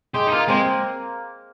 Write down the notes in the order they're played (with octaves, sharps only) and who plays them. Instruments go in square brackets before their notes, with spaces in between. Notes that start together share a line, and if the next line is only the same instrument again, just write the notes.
[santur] G#3 [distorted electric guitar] G4
[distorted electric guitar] D#4
[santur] A#3 [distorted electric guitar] F4
[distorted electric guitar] G#3 [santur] C4